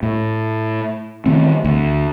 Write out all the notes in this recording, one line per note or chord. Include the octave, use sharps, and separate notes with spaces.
A2
D#3 A3 C4
D2